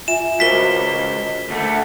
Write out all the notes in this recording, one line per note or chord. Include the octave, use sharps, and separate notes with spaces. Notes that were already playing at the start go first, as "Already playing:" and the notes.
F4 E5 G#5 E7
C#2 F#4 A#4 C5 B6 G7
D2 A3